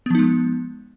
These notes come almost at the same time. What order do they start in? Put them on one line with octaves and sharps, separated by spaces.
B3 F3 D#4 G#3